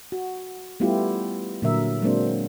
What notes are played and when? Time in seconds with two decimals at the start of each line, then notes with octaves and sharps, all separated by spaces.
0.12 F#4
0.80 G3 A3 B3 E4 F4 G4
1.62 A#2 D3 F#3 A#4 E5
2.02 F#3 G#3 A#3 C4 D4 C5